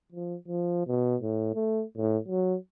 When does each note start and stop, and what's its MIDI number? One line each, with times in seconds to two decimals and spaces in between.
0.12 0.36 53
0.48 0.87 53
0.87 1.16 47
1.21 1.51 45
1.54 1.83 57
1.97 2.18 45
2.28 2.56 54